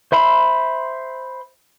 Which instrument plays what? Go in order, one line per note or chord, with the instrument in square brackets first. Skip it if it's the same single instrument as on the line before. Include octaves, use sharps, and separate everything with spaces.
[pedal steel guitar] C5 E5 B5 C6